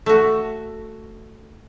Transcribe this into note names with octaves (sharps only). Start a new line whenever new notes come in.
A3 F#4